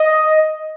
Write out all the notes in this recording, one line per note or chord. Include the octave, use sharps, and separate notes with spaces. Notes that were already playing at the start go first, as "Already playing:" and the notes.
Already playing: D#5